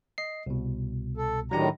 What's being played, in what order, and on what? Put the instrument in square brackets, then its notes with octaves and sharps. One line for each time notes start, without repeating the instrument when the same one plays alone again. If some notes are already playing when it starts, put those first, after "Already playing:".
[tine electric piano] D#5 C7
C2 B2
[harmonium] A4
[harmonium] A2 D#3 A#5 [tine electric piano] F#3 D4 G4